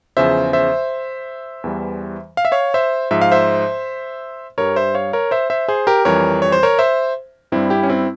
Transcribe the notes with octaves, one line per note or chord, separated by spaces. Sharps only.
E2 C#3 F3 C5 E5
C5 E5
E2 E3 G3
F5
E5
C#5 F5
C5 E5
G#2 F3 E5
F5
C5 E5
G2 G3 A#4 C#5
C5 E5
C#5 F5
A#4 C#5
C5 E5
C5 E5
G#4 C5
G4 A#4
F2 E3 G3 A#4 C#5
C#5
C5
A#4 C#5
C5 E5
G2 G3 C4 E4
E4 G4
C#4
C4 E4